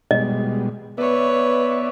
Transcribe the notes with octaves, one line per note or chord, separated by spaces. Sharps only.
B2 G3 G#3 D#5
B3 B4 C#5 D5 E5